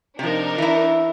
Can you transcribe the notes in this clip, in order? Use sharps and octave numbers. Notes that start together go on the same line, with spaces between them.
C3 F3 D4 D#4 A#4
E3 E4